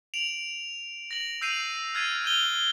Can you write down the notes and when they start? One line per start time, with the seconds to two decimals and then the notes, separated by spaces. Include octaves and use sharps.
0.14 D7 F7 F#7
1.11 A#6 F#7
1.41 E6 G6 C7 D#7 F7 F#7
1.95 F6 F#6 G#6 A6 C7 D#7
2.25 F6 G6 D#7 F7 G7